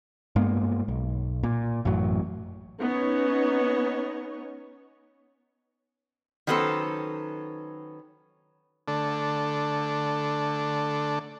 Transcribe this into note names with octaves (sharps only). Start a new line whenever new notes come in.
G2 G#3 A#3 B3
B1
A#2
A1 F#2 A2 F#3
B3 C#4 D#4 C#5
D#3 F#3 B3 C#4 A4 C5
D3 A3 D4 A4